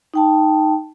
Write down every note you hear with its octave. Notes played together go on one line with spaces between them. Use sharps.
D#4 G5 A5